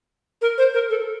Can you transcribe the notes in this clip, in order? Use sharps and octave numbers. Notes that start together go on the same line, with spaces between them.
A#4
C5
A#4
A4